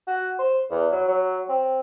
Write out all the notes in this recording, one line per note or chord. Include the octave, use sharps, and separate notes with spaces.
F#4
C5
E2
F#3
F#3
C4